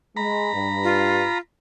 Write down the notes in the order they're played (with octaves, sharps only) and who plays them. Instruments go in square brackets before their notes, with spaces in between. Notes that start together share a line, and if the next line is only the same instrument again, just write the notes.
[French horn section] G#3 [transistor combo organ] A#5 B5
[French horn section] G2
[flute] F4